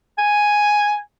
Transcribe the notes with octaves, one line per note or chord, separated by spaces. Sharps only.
G#5